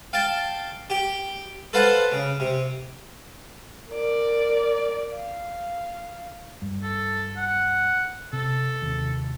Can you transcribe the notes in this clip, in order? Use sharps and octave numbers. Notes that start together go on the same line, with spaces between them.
F5 G5 A5
G4 G5
A4 B4 C5 F5 F#5 A5
C#3
C3
A#4 D5
F5
G2
A4
F#5
C3 A4
D#2 C3